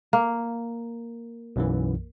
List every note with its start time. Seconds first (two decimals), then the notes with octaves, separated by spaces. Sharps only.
0.13 A#3
1.56 B1 F#2 E3